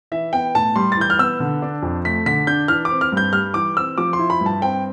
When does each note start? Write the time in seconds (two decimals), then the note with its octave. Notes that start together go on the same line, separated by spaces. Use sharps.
0.12 E3 E5
0.33 B3 G5
0.55 A2 A5
0.76 G3 C6
0.92 A6
0.97 E3 G6
1.10 F6
1.19 B3 E6
1.40 D3
1.62 D4
1.83 F2
2.05 A3 B6
2.26 D3 B6
2.47 D4 G6
2.68 E3 F6
2.85 D6
2.91 C4
3.01 F6
3.12 G2 G6
3.33 G3 F6
3.54 E3 D6
3.76 C4 E6
3.98 F3 D6
4.13 C6
4.19 E4
4.30 B5
4.41 G2
4.46 A5
4.62 C4 G5